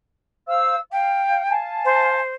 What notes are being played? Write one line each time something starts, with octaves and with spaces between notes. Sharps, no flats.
C5 F5 E6
F5 G5
F5 G#5 A5
C5